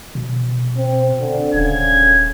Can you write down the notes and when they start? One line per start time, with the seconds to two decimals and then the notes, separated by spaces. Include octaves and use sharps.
0.15 B2
0.77 C4
1.21 D3
1.54 D#1 C#3 G#6